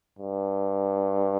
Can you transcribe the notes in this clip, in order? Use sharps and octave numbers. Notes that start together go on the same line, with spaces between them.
G2